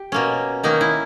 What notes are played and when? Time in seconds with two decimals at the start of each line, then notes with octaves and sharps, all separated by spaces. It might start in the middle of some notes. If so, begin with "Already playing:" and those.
Already playing: G4
0.12 B2 A#3 C#4
0.63 D#3 A#3 C#4 D#4
0.81 E4